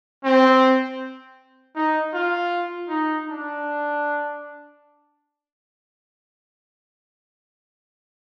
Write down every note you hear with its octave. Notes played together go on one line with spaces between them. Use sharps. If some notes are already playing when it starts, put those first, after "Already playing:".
C4
D#4
F4
D#4
D4